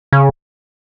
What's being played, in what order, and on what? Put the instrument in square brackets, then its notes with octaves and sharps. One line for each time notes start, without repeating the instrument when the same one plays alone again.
[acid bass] C#3